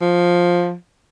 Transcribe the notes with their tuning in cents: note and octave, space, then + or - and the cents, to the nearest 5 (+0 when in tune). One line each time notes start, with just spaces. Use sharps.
F3 +10